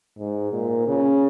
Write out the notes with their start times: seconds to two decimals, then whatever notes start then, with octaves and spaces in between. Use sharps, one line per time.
0.18 G#2
0.52 A#2
0.87 C#3